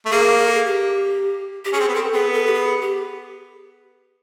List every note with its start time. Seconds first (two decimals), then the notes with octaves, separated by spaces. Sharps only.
0.06 A3
0.11 A#3 G#4
0.39 G#4
0.47 A4
0.54 G#4
0.65 G4
1.65 G4
1.73 C#4 G#4
1.80 C4
1.88 B3
1.94 C4 A4
2.13 B3 G#4
2.33 A4
2.46 G4
2.54 G#4
2.81 G4